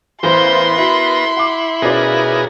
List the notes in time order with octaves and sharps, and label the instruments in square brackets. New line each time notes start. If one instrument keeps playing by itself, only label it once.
[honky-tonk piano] A1 E3 F5 [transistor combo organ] B3 A#4 [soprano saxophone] C5 [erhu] C6
[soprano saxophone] E4 [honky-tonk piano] F#4
[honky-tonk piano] F#5 D6
[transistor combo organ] B2 G#4 A#4 [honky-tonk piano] C#4 F4 D5